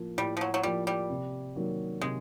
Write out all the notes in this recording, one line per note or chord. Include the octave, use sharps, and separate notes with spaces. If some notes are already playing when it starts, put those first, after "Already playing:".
Already playing: A2 F3 A#3
A2 G3
F3
F#3
F#3
F3 G3 A#3
G3
C3
D#3 F#3 A#3
C3 G#3